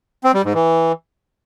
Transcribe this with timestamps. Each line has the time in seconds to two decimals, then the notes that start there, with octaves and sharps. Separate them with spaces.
0.24 C4
0.34 G3
0.44 G#2
0.54 E3